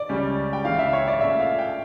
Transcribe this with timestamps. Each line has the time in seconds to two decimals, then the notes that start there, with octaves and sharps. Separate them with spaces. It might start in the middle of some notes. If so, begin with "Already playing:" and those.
Already playing: D5
0.09 C#2 C#3 G3 C#4
0.53 G5
0.65 C#2 C#3 E3 F5
0.79 E5
0.93 C#5
1.08 D5
1.21 A#2 A3 C#4 E5
1.40 F5
1.59 G5